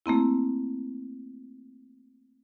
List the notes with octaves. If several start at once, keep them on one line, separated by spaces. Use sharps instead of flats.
A3 A#3 C4 E4